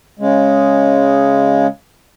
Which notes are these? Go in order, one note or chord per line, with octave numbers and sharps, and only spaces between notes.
C#3 G#3